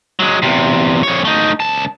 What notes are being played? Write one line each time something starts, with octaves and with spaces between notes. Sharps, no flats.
F#3 G#3
E2 C3
F2 C#5
A3 D#4
C#2 A5